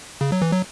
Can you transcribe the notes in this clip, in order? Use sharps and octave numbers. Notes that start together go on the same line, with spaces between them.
C#3
F#3
E3
F#3